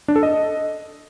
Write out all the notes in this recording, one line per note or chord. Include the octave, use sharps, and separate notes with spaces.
D4
A4
D#5